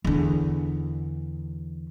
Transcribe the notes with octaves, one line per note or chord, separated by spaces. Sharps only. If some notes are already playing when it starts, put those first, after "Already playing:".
E2 D3